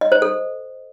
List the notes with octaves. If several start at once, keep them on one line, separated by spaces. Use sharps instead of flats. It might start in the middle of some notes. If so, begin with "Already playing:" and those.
D#5
C5
A4